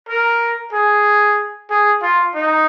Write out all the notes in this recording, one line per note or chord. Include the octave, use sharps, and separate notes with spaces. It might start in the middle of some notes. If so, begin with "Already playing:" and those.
A#4
G#4
G#4
F4
D#4